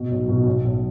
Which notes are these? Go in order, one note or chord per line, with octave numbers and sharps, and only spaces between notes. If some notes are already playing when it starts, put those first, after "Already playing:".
Already playing: B2
B1
B2
B1
B1